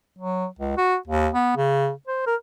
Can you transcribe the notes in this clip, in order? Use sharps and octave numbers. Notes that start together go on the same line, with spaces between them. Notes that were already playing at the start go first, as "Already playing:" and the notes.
F#3
C#2
F#4
D#2
B3
C#3
C5
A#4